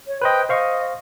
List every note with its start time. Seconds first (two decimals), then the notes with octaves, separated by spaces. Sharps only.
0.07 C#5
0.21 B4 C5 D#5 G5
0.49 C5 D#5 F5 C#6